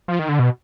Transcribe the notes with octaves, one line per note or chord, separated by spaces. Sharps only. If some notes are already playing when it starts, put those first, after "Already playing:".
F3
D#3
D3
B2